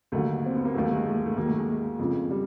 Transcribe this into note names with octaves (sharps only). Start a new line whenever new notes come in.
D#2 D3 F#3 A3
C4
B3
A#3
D#2 D#3 F#3 A3
A3
G#3
A3
A3
D#2 D#3 F#3 A#3
A3
G#3
F2 C#3 F3
G3